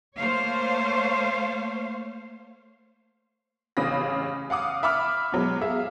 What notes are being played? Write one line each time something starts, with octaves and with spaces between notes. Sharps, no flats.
A3 A#3 C5 C#5 F5
A1 C#3 F5 B5 A#6
F5 F#5 D6 D#6
E5 B5 D6 F6
B2 F#3 G#3
G#4 E5 F5